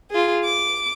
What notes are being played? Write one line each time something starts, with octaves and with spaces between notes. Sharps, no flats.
F4 G#4
D6